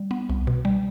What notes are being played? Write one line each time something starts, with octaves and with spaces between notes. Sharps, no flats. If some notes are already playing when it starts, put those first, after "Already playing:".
Already playing: G3
B3
C2
B2
G3